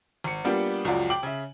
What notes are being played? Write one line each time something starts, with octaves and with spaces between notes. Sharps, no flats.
G#1 C#7
G3 A#3 B3 D4 F4 G4
C#2 F#2 F3 F4 F#4 D5
G5 D6 F#7
C#3 E5